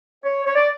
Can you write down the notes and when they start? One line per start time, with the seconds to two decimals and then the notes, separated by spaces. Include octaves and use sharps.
0.24 C#5
0.46 C#5
0.55 D5